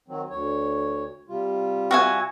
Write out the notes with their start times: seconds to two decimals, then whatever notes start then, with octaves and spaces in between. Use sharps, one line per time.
0.08 D#3 F#3 C4
0.30 D2 C#5
1.28 C3 G3 F4
1.91 F#4 E5 G#5